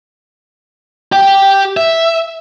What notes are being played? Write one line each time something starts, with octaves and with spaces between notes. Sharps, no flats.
G4 G5
E5